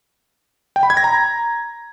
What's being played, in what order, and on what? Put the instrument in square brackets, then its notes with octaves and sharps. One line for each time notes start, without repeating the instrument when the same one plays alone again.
[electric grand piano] G5
B5
G#6
A#6
A#5